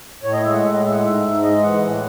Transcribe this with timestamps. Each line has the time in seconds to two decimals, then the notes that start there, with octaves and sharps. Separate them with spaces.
0.23 A2 C#5
0.33 D#5
0.43 G#3 E5
0.53 F#5
0.63 A2 E5
0.72 D#5
0.83 G#3 E5
0.93 F#5
1.02 G#2 E5
1.22 G#2
1.42 G#3 D#5
1.62 E3 F#5
1.83 A2